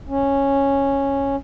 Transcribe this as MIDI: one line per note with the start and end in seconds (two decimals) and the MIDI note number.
0.09 1.36 61